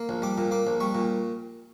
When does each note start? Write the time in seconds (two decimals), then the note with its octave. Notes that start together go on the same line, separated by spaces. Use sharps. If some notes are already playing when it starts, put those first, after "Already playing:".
Already playing: A#3
0.09 A#1
0.22 G3 D6
0.38 A#2
0.51 A#3 D6
0.67 A#1
0.80 G3 C#6
0.95 A#2